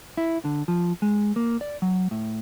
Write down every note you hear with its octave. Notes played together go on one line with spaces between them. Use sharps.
E4
D3
F3
G#3
A#3
D5
F#3
A2